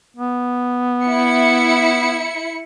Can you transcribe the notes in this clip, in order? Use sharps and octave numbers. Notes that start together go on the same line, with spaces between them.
B3
E4 C#7